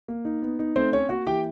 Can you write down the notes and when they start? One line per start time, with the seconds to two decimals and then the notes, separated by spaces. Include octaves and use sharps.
0.08 A#3
0.25 D#4
0.42 B3
0.59 D#4
0.76 A3 C4 C5
0.92 C4 C#4 C#5
1.09 A#3 F#4 F#5
1.27 E3 G4 G5